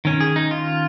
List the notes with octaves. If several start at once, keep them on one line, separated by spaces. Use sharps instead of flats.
D#3 C#4
G#4
D#4
F4